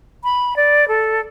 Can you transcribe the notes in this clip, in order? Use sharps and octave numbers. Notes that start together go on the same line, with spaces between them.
B5
D5
A4